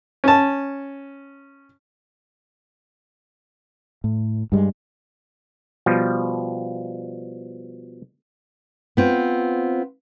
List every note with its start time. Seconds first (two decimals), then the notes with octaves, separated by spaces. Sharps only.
0.24 C#4 A5
4.04 A2
4.52 G2 G3 G#3
5.86 B2 F3 G3
8.97 B3 C4 F4